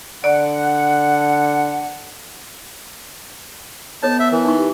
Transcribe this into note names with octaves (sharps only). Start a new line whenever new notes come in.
D3 D5 F#5
B3 A4 C#5 D#5 A5
E5
E3 A#4
D#4 C#6
G4